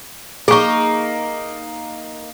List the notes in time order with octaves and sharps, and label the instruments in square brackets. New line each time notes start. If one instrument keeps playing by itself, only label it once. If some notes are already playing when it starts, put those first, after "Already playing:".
[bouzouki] A#3 D#4 [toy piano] G#4 C#6